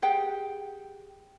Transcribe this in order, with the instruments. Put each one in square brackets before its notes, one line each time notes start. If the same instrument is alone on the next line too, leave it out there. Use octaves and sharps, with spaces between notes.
[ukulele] G4 G#4 F#5 G5